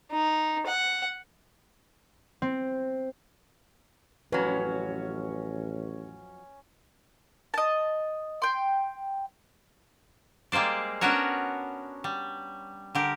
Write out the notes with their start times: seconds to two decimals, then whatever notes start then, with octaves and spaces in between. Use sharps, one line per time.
0.12 D#4
0.66 F#5
2.42 C4
4.32 A1 F2 F#3 C#4 B4
7.54 D#5 A5
8.42 G5 C6
10.52 G3 G#3 A#3 C5 D5
11.01 B3 C#4 D4 F#4 A#4 C#5
12.04 G3
12.95 D3 G4 A#4